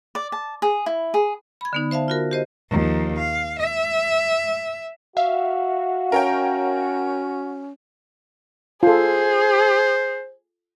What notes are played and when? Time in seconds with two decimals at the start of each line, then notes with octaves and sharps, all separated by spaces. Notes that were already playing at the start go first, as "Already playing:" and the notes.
0.15 D5
0.32 A5
0.62 G#4
0.86 E4
1.14 G#4
1.61 B5 G#6
1.73 D3 B3 D#4
1.91 C5 E5 F5 A5
2.08 F4 F#4 A#4
2.31 G4 C5 D#5
2.70 D#2 F3
3.17 F5
3.59 E5
5.17 F#4 E5 F5
6.12 C#4 A#4 C#5 G5
8.83 F4 G#4 A4 C5